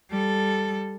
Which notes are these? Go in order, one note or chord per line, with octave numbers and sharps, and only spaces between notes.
G3 A4